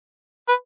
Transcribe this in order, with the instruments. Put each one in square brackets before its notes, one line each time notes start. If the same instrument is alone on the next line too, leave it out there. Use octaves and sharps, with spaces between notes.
[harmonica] B4